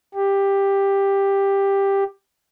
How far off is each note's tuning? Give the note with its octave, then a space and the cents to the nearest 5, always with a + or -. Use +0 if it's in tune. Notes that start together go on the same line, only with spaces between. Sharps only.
G4 +10